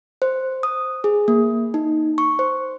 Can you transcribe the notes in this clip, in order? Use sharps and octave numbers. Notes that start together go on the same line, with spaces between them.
C5
D#6
G#4
A#3
D#4
C#6
C5